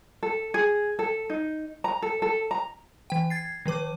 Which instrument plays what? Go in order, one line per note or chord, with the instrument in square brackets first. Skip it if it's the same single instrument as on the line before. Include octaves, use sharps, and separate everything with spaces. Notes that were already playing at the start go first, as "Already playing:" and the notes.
[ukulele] A4
G#4
A4
D#4
A#5
A4
A4
A#5
[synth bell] E3 G5
G#6 A6 C7
D#3 F3 B4 D6